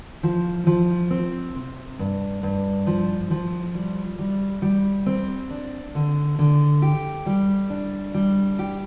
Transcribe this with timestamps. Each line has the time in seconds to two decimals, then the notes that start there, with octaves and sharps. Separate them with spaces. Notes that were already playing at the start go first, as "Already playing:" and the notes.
0.23 F3
0.67 F3
1.10 C4
1.56 C3
1.99 G2
2.43 G2
2.87 F3
3.31 F3
3.75 G3
4.19 G3
4.62 G3
5.06 C4
5.50 D4
5.95 D3
6.39 D3
6.82 G4
7.26 G3
7.70 D4
8.14 G3
8.59 G4